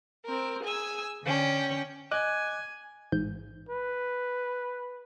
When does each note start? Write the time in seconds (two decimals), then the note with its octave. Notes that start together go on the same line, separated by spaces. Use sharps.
0.24 C4 A#4
0.63 G#4 G#5 E6
1.24 D3 C#4 G5
2.12 D#5 G#5 D6 F#6
3.12 A1 G#2 G6
3.69 B4